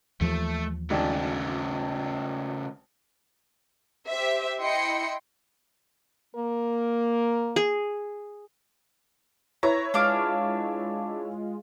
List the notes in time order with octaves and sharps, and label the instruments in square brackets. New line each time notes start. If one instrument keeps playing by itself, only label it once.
[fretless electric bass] D#2 E3 F3 [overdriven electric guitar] A3
[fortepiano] G#1 D4 [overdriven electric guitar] C#3 A3
[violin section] G4 C5 E5
E4 D#5 G5 C6 C#7
[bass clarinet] A#3 [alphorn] A#4
[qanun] G#4
[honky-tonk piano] E4 B4 C#5 [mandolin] A#5
[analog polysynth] G#3 F4 [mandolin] D4 F5 D6